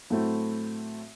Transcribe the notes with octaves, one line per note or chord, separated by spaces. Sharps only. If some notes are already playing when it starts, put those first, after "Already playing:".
A2 F#3 A3 C4 E4